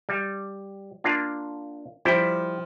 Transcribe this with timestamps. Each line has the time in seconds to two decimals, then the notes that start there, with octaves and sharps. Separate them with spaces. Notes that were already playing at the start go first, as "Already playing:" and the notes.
0.09 G3
1.04 A#3 D4 F4
2.05 F3 G3 E4 G5